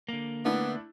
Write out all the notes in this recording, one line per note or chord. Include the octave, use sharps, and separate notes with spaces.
D3 A#3
A3 B3 D4 E4